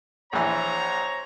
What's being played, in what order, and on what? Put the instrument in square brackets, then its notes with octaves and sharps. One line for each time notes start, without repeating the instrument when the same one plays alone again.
[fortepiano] A#1 E3 [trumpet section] C5 C#5 A#5